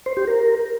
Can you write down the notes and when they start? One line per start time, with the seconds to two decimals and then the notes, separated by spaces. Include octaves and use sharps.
0.06 C5
0.17 G4
0.28 A#4